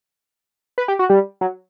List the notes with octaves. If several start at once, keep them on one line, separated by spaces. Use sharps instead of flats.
B4
G4
F#4
G3
F#3